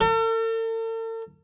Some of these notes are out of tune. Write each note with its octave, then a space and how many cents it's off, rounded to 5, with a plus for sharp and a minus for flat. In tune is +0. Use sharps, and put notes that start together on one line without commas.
A4 +45